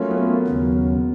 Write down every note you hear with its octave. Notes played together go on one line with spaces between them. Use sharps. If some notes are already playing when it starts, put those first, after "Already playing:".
Already playing: F#3 A3 A#3 C#4 F4
B3
A#3
D#2 C#3 F#3